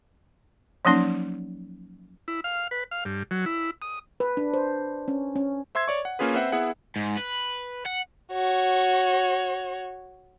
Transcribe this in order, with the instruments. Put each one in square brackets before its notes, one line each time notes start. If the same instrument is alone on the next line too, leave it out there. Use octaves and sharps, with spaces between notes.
[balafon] F3 F#3 A#3 C#4 D#4
[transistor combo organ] E4
F5
B4
F5
G2
F#3
E4
D#6
[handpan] B4
D4
C5
C#4
C#4
[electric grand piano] C5 E5 C6 E6 G#6
C#5 D5 C#6
F#5
A#3 C#4 F4 G#4 B4
C4 B4 C5 E5 F#5
B3 E4 G#4 E5 F#5
[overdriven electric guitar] G#2
B4
F#5
[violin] F#4 C#5